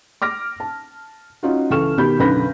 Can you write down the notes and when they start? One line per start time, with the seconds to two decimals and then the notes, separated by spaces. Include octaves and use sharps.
0.22 D6 F6 A#6
0.60 A5
1.43 C#4 D#4 F4 F#4
1.71 C#2 E3 A4 C#6 F6 E7
1.98 B2 D#3 G4 B5 G6
2.19 B1 F#2 D3 B4 B5 A#6